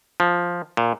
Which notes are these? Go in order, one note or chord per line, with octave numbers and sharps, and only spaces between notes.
F3
A#2